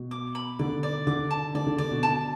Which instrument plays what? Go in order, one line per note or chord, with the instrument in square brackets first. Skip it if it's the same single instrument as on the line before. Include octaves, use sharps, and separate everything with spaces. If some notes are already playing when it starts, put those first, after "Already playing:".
Already playing: [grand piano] B2
[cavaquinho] D6
B5
[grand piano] D3 [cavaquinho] D5
[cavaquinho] D5
[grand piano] D3 [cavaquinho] D6
[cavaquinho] A5
[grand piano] D3 [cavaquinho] D5
[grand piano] D3
[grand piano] D3 [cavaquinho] D5
[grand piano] B2
[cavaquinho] A5